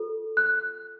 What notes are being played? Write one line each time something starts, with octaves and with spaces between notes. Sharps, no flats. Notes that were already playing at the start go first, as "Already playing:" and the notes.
Already playing: F4 A4
F#6